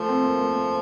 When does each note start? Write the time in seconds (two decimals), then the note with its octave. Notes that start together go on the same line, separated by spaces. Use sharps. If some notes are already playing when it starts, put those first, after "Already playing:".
Already playing: F3 A3
0.08 C4
0.24 A#3
0.40 A3
0.56 A#3